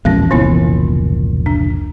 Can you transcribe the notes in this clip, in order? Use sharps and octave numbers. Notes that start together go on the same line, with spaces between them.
A#1 E2 B2 G#3 C#4
F1 C#2 A#2 E3 B3 E4
D4